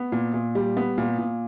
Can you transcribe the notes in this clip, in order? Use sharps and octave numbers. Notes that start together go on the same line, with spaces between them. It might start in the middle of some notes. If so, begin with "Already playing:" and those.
Already playing: B3
A#2
A#2
G3
B3
A#2
A#2